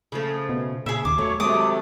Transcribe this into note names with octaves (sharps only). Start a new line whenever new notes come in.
C#3 F3 A3
B2
A#2 C#3 G#4 E5
D#2 D6
F#3 A3 C#5
D#2 C3 F#3 G#3 A3 D6 D#6